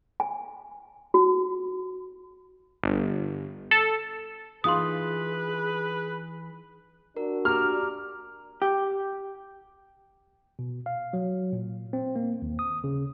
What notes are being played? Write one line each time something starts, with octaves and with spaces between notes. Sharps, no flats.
G#5
F#4
G1
A4
E3 D#4 F4 G#4 B4 C6 D#6
D4 F#4 A#4
G4 A#5 D6 F6
G4
B2
F5
F#3
A#2
C4
A#3
D#2
D#6
C#3